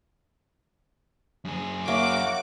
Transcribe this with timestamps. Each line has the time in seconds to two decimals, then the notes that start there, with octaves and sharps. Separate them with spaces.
1.45 F#2 G#4
1.88 A#3 F#4 C#5 E5 D6